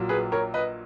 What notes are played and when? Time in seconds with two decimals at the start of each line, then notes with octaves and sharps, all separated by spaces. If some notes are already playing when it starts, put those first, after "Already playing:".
Already playing: A#1 A#2 F#3
0.09 G#4 B4
0.32 A#4 C#5
0.54 B4 D#5